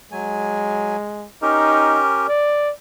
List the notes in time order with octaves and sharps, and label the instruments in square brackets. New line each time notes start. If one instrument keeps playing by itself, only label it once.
[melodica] F#3 G#5 [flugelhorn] G#3
[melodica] C#4 G4 A#4 [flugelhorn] D#4
[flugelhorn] D5